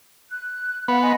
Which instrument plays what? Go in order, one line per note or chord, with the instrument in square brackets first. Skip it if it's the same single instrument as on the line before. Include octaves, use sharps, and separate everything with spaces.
[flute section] F#6
[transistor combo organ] B3 [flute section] F5 F#5
[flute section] D#5 G#5 C6